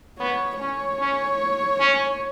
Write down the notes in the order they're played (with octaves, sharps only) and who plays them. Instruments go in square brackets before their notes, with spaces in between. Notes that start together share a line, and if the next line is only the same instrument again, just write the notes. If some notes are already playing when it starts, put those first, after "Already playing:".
[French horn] B3 [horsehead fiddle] C#5
[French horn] C#4 [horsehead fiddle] C#5
[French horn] C#4
C#4